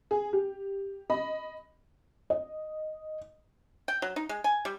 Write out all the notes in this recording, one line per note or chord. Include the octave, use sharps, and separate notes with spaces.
G#4
G4
D#5 B5
D#5
G5
F#3
D#4
G#3
G#5
G3